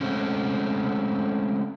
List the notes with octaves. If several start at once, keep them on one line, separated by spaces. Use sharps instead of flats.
G#3 A3 C4 C#4